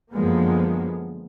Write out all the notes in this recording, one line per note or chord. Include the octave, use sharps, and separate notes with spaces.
F#2 D3 F3 G#3 A#3 B3